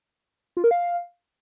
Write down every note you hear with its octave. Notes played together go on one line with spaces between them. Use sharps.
F4
A#4
F5